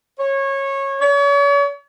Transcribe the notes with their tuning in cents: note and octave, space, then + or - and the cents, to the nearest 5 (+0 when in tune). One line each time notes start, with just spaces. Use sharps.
C#5 -20
C#5 +40